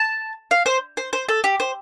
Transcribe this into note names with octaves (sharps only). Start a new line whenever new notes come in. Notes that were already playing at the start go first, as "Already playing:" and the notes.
Already playing: A5
F5
C5
C5
C5
A4
G4
C5